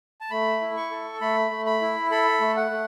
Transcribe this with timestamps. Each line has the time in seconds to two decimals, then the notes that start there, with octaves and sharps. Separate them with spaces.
0.21 A5
0.31 A3 B5
0.61 E4
0.77 C#6
0.91 A4
1.21 A3 B5
1.51 A3
1.66 B5
1.82 E4
2.11 A4 B5
2.41 A3
2.56 F#5
2.71 A3